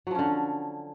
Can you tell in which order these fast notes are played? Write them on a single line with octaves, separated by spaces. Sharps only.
F#3 F3 C#4 D3